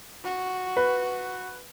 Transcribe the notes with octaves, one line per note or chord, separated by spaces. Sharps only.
F#4
B4